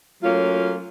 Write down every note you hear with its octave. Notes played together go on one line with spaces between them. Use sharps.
F#3 A3 A#3 C#4 F4